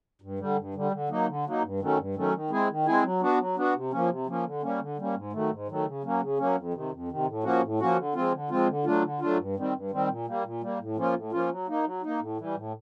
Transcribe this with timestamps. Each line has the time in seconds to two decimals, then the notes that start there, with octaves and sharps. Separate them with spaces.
0.22 G2
0.39 D3 G3
0.57 G2
0.74 D3 G3
0.92 D3
1.09 F#3 A#3 D#4
1.27 D3
1.45 F#3 A#3 D#4
1.62 G2
1.80 D#3 F#3 A3 C#4
1.97 G2
2.15 D#3 F#3 A3 C#4
2.33 D#3
2.50 G#3 C4 E4 G#4
2.69 D#3
2.86 G#3 C4 E4 G#4
3.03 F#3
3.21 B3 D4 F#4
3.38 F#3
3.56 B3 D4 F#4
3.74 C3
3.91 F3 A#3 C#4
4.09 C3
4.27 F3 A#3 C#4
4.44 D3
4.62 G3 A#3 C#4
4.80 D3
4.97 G3 A#3 C#4
5.15 G#2
5.33 D#3 F#3 A3
5.50 G#2
5.68 D#3 F#3 A3
5.85 C#3
6.03 F#3 A#3 C#4
6.20 C#3
6.38 F#3 A#3 C#4
6.56 F2
6.74 C3 D#3
6.91 F2
7.08 C3 D#3
7.27 A2
7.44 F3 A#3 C#4 F#4
7.62 A2
7.79 F3 A#3 C#4 F#4
7.96 D3
8.15 F3 G#3 C4 F4
8.32 D3
8.49 F3 G#3 C4 F4
8.67 D3
8.85 F#3 A3 D4 F4
9.03 D3
9.20 F#3 A3 D4 F4
9.38 G2
9.56 D#3 G3 C4
9.73 G2
9.91 D#3 G3 C4
10.08 A#2
10.26 G3 A#3
10.44 A#2
10.61 G3 A#3
10.79 A2
10.96 F3 A#3 C#4 F4
11.14 A2
11.32 F3 A#3 C#4 F4
11.49 F#3
11.67 A#3 D#4
11.84 F#3
12.02 A#3 D#4
12.20 A2
12.37 E3 G3
12.55 A2